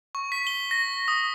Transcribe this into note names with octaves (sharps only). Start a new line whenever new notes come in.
C#6
B6
G7
A#6
D#6